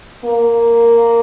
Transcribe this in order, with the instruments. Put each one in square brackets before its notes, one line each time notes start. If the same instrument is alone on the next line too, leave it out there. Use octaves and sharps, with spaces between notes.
[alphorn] A#3